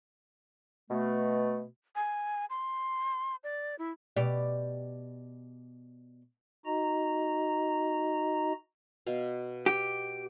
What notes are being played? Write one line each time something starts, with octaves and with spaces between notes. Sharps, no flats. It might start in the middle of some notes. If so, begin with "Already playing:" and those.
B2 A3
G#5
C6
D5
E4
B2 G4 D5
D#4 F#4 D#5 A#5
B2 F5
G4